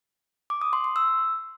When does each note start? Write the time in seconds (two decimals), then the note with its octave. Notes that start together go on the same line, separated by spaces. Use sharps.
0.50 D6
0.62 D#6
0.73 C6
0.84 C6
0.96 E6